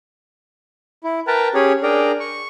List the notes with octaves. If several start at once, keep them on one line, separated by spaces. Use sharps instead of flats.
E4
A#4 B4 G5 A5 A#5
C#4 G4 G#4 C#5
D4 G#4 A#4 D5 G5 A#5
C#6